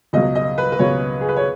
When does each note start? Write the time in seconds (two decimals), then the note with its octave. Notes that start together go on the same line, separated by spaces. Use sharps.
0.13 C#2 B2 F#3 D#5
0.35 D#5
0.58 B4
0.72 B4
0.79 C#2 B2 F#3 C#5
1.21 G#4
1.29 B4
1.37 C#5